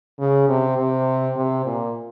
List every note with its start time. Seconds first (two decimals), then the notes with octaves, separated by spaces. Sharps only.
0.20 C#3
0.49 C3
0.78 C3
1.36 C3
1.65 A#2